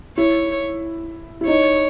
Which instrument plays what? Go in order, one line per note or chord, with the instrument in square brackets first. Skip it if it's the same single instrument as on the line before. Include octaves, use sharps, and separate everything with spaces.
[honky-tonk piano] E4 [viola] C#5
[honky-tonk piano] E4
[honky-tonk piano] D#4 [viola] C#5